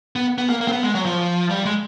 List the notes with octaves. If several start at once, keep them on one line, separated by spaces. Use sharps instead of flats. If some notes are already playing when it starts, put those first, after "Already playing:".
B3
B3
A#3
A#3
C4
B3
G#3
F#3
F3
G3
G#3